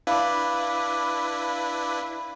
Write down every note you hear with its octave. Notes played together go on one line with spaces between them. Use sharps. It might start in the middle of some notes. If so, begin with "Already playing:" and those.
D4 E4 B4 F5 B5 D6